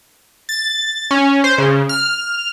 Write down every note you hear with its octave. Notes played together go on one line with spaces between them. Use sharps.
A6
C#4
C5
C#3
F6